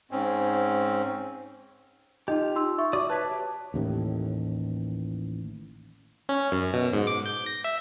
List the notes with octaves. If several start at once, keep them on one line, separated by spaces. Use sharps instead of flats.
G#2 C4 C#4
D#4 F4 G4 D#5
D#4 C6 E6
E5 C#6
F#4 D5 D6 D#6
B4 C#5 E5 A5
G4
A1 D#2 A2
C#4
F#2
B2
G#2
D6
G6
A#6
E5